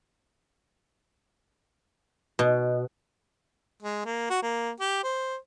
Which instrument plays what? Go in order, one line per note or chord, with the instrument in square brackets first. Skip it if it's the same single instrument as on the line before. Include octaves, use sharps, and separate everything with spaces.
[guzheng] B2
[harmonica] G#3
A#3
F#4
A#3
G4
C5